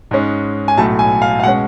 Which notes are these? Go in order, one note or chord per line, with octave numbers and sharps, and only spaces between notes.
G#2 G#3 C#4
G#5
B1 A2 F#3 A3 A5
G#5
F5
F5
B2 G#3 C#4 F#5